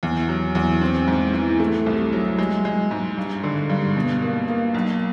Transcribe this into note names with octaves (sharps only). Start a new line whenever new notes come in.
E2
F#3
E2
C4
G#2
E3
A3
C2
F#3
G#3
G#3
G#2
G2
D3
G2
B2
A#3
A#3
B1